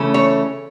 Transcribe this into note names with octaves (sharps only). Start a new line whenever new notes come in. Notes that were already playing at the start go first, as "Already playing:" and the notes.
Already playing: C#3 E3 A3 C#4
C#5